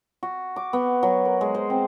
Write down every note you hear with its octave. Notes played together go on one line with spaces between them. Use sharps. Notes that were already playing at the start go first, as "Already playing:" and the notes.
F#4
D6
B3
F#3
A#4
G#3
C5
C4